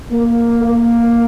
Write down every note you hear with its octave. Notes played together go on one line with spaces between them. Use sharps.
A#3
A#3